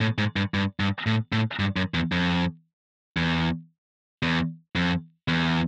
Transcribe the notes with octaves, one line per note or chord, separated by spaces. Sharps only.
A2
G#2
G2
G2
G2
A2
A2
G2
F#2
E2
F2
E2
E2
F2
E2